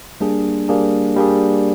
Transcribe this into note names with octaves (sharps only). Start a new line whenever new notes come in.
G3 A#3 D4 G#4
G3 A#3 D4 G#4
G3 A#3 D4 G#4